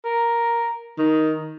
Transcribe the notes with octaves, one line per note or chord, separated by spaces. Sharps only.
A#4
D#3